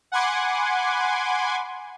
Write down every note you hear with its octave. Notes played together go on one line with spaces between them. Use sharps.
F#5 G#5 B5 C6 D6 G#6